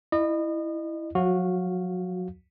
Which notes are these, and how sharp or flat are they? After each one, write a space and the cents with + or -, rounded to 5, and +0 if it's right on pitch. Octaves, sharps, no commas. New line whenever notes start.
E4 +0 D#5 -35
F#3 -35 F#4 -15 F5 +0